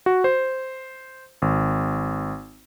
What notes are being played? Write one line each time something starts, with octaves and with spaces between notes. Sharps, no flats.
F#4
C5
G#1